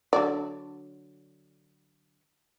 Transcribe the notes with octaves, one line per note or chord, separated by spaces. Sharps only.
D3 F#3 D5